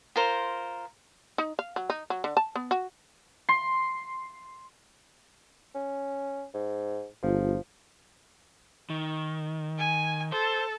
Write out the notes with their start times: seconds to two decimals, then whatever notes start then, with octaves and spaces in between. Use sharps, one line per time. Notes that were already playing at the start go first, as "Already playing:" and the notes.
0.16 F4 A#4 C5
1.38 D#4
1.59 F5
1.76 F#3
1.90 D#4
2.10 F#3
2.24 D3
2.37 A5
2.55 B3
2.71 F#4
3.49 C6
5.74 C#4
6.54 G#2
7.23 G1 F3
8.90 D#3
9.78 G#5
10.32 A4 C5